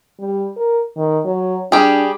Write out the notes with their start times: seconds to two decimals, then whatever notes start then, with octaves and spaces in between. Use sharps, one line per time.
0.20 G3
0.57 A#4
0.97 D#3
1.25 F#3
1.72 G3 D4 G4 G#4